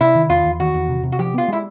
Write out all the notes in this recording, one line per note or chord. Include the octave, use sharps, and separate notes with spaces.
C3 E4
D#3
E2 F4
E2
D#3 F#4
E2
C3
C3
F#4
F3 G4
B3 F4
G#3 E4